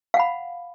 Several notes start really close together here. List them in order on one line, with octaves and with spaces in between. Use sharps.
F5 F#5 B5